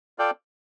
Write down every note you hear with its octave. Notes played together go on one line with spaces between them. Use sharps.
F4 A4 D5 G5